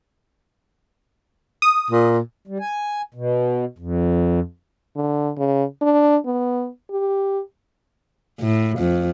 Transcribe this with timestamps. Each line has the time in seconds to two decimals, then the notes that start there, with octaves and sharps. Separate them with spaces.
1.62 D#6
1.90 A#2
2.47 G3
2.60 G#5
3.14 B2
3.78 F2
4.97 D3
5.38 C#3
5.82 D4
6.26 B3
6.91 G4
8.39 A2
8.78 F2